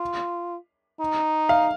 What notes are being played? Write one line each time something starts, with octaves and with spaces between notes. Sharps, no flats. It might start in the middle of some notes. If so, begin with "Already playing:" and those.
Already playing: F4
D#4
F5